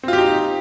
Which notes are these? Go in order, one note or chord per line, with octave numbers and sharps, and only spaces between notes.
C4 D#4 F4 G4